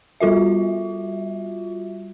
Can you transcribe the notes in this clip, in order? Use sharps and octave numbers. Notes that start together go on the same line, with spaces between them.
G3 F4 F#4 E5